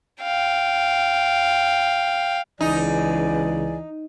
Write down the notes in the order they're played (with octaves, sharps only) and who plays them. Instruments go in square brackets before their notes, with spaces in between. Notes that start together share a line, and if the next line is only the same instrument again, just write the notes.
[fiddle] F5 G5
[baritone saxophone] C#2 [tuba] E3 [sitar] D#4 [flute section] G#4 D5 G#5